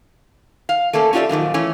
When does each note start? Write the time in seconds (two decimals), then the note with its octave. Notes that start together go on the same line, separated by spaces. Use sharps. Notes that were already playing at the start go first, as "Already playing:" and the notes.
0.69 F5
0.93 A3 A#3 C#4 A4
1.13 C#4 D4 F4 G4 D5 E5
1.29 F#2 A#2 D#3 F3
1.54 E3 A3 C#4